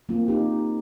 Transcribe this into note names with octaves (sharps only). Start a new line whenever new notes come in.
A#3 C4 F4
D#4 G4